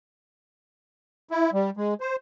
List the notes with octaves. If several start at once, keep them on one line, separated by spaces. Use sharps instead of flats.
E4
G3
G#3
C5